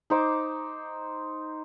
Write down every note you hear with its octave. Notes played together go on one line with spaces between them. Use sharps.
D#4 C5 D6